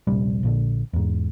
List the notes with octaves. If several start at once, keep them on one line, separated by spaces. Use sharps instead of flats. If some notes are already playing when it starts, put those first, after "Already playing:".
D#1 A#1 C3 G3
A#1 A#2 D3
E2 G#2